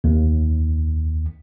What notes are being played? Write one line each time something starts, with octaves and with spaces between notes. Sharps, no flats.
D#2